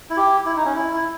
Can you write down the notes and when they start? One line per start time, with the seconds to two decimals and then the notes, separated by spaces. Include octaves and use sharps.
0.10 E4
0.17 G4
0.46 E4
0.56 D#4
0.65 C#4
0.75 E4
0.93 E4